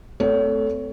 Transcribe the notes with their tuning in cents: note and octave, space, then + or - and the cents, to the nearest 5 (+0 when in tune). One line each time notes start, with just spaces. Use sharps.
A3 +0 C4 -35 C#5 +35